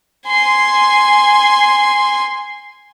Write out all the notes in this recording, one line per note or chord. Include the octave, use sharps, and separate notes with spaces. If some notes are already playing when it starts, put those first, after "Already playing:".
G#5 C6